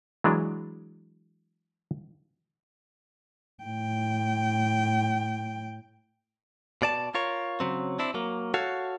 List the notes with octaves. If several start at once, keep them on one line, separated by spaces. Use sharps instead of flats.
E3 F#3 G#3 D4
A2 G5
B2 D5 A5
F4 A#4 C#5
C#3 F#3 C4
C4 D4 E4
F#3 A#3
F#4 A4 C#5 F5